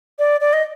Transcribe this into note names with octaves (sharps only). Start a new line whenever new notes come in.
D5
D5
D#5